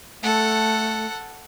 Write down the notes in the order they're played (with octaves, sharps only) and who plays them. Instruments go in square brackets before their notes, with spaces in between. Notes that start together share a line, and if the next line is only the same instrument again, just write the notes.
[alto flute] A3 [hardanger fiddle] A4 F#5